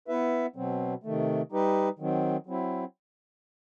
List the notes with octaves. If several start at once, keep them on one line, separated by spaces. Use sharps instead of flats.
B3 E4 B4 E5
B2 F#3 C4
C3 D#3 A3
G3 D#4 G4 B4
D#3 F#3 C4
F#3 C4 E4